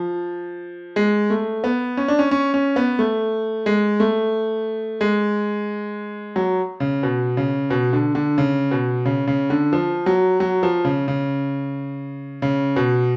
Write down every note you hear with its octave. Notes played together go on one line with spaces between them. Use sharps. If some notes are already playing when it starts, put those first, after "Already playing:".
Already playing: F3
G#3
A3
B3
C#4
D4
C#4
C#4
C#4
B3
A3
G#3
A3
G#3
F#3
C#3
B2
C#3
B2
D3
D3
C#3
B2
C#3
C#3
D3
F3
F#3
F#3
F3
C#3
C#3
C#3
B2